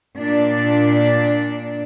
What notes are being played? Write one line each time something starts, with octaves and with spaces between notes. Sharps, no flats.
A#2 D4 D5